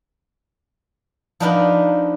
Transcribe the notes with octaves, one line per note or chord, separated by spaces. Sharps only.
F3 B3 D4 D#4 A#4 B4